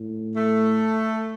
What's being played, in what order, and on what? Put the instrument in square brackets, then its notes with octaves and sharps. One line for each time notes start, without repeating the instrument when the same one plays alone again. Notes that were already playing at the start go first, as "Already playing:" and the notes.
Already playing: [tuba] A2
[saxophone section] A3